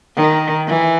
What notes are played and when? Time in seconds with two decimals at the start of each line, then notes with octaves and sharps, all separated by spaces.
0.16 D#3
0.68 E3